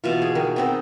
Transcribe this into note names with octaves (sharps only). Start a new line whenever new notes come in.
B2 E3 F4
G#4
D#3
B3 C4 D#4